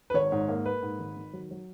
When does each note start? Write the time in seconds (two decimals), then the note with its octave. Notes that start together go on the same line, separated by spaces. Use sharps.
0.10 B4
0.14 G#1 C#5
0.32 G#2
0.49 A#3
0.66 A#3 B4
0.82 G#2
0.99 G#1
1.17 D#3
1.33 F#3
1.51 F#3